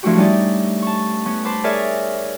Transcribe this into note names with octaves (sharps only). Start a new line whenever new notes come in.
A2 F3 A3 D4 F#4 G4
G3 C#4 D#4 D5
A5 C#6
B3 C#4
C5 A5 B5 D6
G#4 A#4 C#5 D5 E5 G#5